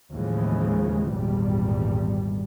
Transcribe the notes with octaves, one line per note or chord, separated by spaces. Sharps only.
D#2 A2 C#3 E3 F3 G#3
G#1 E2 A#2 G3